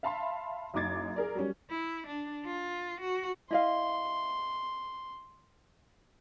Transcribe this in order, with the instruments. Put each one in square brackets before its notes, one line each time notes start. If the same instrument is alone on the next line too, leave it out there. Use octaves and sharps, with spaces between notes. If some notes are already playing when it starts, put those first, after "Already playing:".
[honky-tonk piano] E5 F5 A5 B5 C6
F#1 F#2 D#4 D6 G#6 A6
G#4 A#4 D5
F#3 G3 C#4
[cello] E4
D4
F4
F#4
[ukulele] E4 D#5 F5 [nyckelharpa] C6